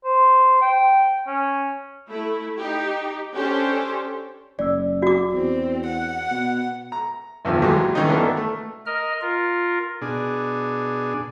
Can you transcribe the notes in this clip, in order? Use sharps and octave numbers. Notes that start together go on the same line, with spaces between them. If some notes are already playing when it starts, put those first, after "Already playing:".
C5
G5
C#4
A3 E4
D#4 G4
C#4 D4 G4 A4 C5
F#1 D5 E6
F#4 D6
E2 C4
F#5
B2
A#5
B1 E2 D#3 F3
G#2 D#3 E3 F#3 G3 A#3
G2 D#3 E3 C#4 D#4
E3 B3 D4 F#4 A4 A#4
A3
A#4 D#5 F6
F4 A#4
B2 D4 G#4